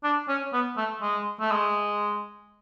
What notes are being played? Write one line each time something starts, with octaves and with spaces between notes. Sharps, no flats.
D4
C#4
B3
A3
G#3
A3
G#3